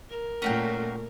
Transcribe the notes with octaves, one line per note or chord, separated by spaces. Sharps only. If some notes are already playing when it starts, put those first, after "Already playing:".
A#4
A#2 A3 C#4 F#4 G5